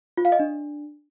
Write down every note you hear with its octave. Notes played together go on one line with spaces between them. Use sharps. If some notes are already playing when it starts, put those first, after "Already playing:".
F4
F5
D#5
D4